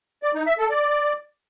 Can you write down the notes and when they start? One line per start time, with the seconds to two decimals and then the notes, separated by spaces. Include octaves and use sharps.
0.23 D5
0.35 D#4
0.46 E5
0.58 A4
0.70 D5